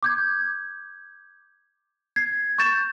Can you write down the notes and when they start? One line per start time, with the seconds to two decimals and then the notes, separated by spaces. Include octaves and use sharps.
0.03 D6 G6 G#6
2.16 G#6 C7
2.58 C#6 G6 A6 E7